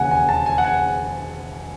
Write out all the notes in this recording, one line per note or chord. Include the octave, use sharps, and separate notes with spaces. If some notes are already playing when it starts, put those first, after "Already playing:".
Already playing: E1 D#2 C#3 F#5 G#5
G#5
A5
G#5
F#5
G#5